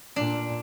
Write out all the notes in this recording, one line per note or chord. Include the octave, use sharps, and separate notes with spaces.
A#2 D4